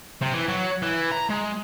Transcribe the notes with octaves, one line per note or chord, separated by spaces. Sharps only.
C3
E3
F#3
E3
A#5
G#3